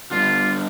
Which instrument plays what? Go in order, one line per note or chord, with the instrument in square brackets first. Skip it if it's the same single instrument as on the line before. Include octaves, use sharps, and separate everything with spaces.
[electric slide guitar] D3 G3 B3 D4 [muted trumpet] F4